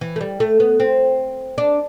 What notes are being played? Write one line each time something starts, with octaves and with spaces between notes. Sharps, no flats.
E3
A3
G3
A3
B3
C4
D4